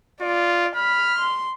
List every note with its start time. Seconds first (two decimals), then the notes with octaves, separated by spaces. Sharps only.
0.21 F4 D5
0.76 B5 F6
1.19 C6